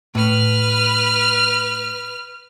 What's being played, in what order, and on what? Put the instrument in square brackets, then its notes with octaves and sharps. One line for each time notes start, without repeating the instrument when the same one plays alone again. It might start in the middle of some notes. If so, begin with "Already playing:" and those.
[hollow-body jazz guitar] A2 [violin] B4 F6